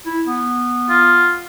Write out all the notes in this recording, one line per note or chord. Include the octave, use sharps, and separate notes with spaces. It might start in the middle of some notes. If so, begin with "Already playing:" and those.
E4
B3
F4